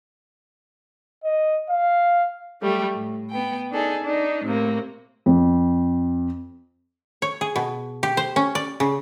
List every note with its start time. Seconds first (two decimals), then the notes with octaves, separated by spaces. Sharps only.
1.24 D#5
1.69 F5
2.60 F#3 G3 A3 G4
2.93 A2
3.30 B3 G5
3.71 D4 D#4 G#4 A4
4.04 D4 D#4
4.44 A2 C3 A#3
5.26 F2
7.22 C#5
7.41 G#4
7.56 B2
8.03 G4
8.17 C5
8.36 C#4
8.55 D5
8.80 C#3